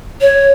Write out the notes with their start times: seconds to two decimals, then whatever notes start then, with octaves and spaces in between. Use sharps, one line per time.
0.21 C#5